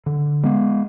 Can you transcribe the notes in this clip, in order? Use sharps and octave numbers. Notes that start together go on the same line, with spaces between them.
D3
G#3 B3